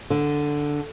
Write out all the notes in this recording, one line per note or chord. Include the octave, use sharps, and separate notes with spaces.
D3